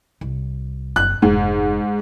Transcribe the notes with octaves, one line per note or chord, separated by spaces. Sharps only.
C2
F#1 F#6
F1 G#2